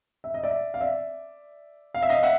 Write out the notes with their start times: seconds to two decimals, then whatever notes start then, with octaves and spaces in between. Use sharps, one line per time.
0.24 E5
0.34 D#5
0.43 D5 E5
0.74 F5
0.81 D5 E5
1.94 F5
2.03 E5
2.09 D#5 F5
2.23 E5 F#5